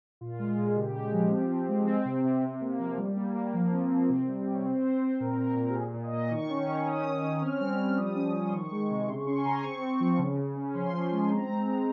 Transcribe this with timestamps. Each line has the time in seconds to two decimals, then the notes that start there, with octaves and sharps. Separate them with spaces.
0.21 A#2 F4
0.39 G#3
0.58 A#2
0.66 G#4
0.76 C#3 G4
0.95 G#3
1.13 F3
1.31 C4
1.50 C4
1.68 G#3
1.87 C4
2.05 C3
2.24 C3
2.42 C3
2.61 A#3
2.79 F3
2.98 G3
3.16 A#3
3.35 A#3
3.54 F3
3.72 C4
3.91 C4
4.09 C3
4.28 G3
4.46 C3
4.54 C#5
4.65 C4 C5
4.83 C4
5.01 C4
5.20 A#2 A#4
5.38 A#2
5.56 A#2
5.70 G4
5.75 A#2 G#4
5.94 A#2
6.03 D#5
6.13 A#2
6.30 D#3 C#6
6.49 C#4
6.68 D#3
6.86 C#4 D#6
7.05 C#4
7.23 C#4
7.42 C4 F6
7.60 G3
7.79 G3
7.90 F6
7.97 F3 D#6
8.15 C#4
8.34 F3
8.48 C6
8.53 D#3 C#6
8.71 G#3
8.90 C3
9.08 C#3 C6
9.20 C#6
9.26 C#4 C6
9.38 G#5
9.45 C#3 A#5
9.64 C4 C#6
9.82 C4
10.00 F3
10.19 C#3
10.38 C#3
10.56 C#4
10.74 F3 C6
10.93 F3
11.12 G#3
11.19 G#5
11.30 C4 A#5
11.49 G#3
11.67 C4